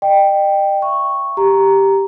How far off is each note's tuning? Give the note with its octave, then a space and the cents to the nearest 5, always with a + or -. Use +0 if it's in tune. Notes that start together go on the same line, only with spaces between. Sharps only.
D#5 -45 G5 +0
E5 +45 C#6 -5
G4 +0 A#5 +0